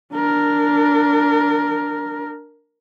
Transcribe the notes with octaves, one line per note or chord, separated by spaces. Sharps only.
D4 A#4